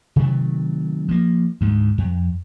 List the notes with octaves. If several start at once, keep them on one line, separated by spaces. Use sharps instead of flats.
C3 D#3 F#3 A3
F3 A#3
D2 G#2
F2